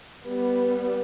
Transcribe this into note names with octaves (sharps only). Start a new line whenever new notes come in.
G3 B3